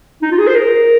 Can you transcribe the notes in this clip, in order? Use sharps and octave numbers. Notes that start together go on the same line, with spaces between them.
D#4
F4
G#4
C5
A#4